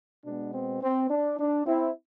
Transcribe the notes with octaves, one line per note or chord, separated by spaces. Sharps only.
B2 G#3 B3 D4
C4
C4
D4
D4
C4 E4